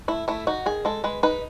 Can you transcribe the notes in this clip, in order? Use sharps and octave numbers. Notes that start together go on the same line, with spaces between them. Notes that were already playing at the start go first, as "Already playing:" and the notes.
A3 E4
A3 E4
D#4 F#4
D#3 G#4
G#3 A4
G#3 B4
D#4 B4